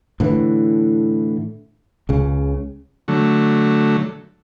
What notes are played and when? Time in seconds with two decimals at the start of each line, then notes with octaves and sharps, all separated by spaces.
0.20 A2 D3 E3
2.09 C#2 C#3
3.08 D3 F#3 A3